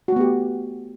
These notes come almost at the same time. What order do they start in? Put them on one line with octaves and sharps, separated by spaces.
F#4 A3 B3 G4